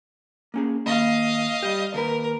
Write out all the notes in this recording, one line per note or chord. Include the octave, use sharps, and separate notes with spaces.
A#3 C#4 G#4
D#2 A#3 D#5 F5 B5
G3 G4
D#2 A#4 B4